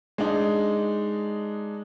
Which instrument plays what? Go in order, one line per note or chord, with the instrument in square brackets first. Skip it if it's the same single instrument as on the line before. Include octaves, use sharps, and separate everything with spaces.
[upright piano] G#3 D4 D#4